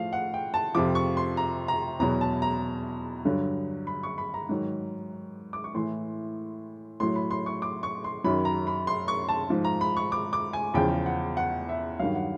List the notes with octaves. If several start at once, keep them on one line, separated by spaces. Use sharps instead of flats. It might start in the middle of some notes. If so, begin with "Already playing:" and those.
Already playing: A2 F3 F5
F#5
G5
A5
F2 C3 F3 D6
C#6
C6
A#5
A#5
E2 B2 F#3 A#5
A5
A#5
G2 D3 F#3
B5
C#6
B5
A#5
G#2 D#3 F#3
D6
C#6
A2 E3 C6
A2 F#3 C6
B5
C6
C#6
D6
C#6
C6
F#2 D#3 F#3 B5
A#5
B5
C6
C#6
A5
G#2 F3
A#5
B5
C#6
D6
D6
G#5
E2 C#3 F3 G5
F#5
F#5
E5
G2 D#3 F#3 F5
F#5